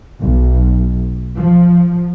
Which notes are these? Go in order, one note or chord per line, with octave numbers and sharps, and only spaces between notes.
B1
F3